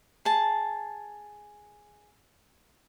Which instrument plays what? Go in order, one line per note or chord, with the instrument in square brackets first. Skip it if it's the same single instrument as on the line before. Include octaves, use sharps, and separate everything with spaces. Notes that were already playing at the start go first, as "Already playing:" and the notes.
[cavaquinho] G#4 A5